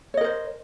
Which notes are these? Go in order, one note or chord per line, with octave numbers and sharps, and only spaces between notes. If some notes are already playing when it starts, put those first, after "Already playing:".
A#4 C5 C#5 D#5